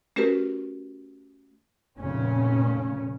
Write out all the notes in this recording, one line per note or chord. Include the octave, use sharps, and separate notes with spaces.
A3 C#4 F#4 G4 A#4 B4
F1 A#2 C#3 C#4